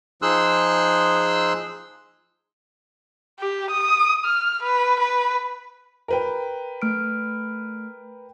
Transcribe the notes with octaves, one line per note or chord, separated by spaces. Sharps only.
F3 D#4 G#4 C6 E6 F#6
G4
D#6
F6
B4
B4
A#4 B4 G5
A3 F6 D7